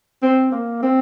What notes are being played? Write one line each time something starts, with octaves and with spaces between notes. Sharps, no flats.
C4
A#3
C4